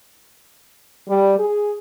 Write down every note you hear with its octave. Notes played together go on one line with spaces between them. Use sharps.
G3
G#4